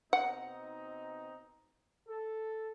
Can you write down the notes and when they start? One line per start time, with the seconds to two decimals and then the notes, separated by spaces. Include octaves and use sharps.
0.13 B2 C4 D#4 F#5
2.08 A4